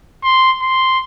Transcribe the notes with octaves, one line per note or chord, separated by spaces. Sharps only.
C6
C6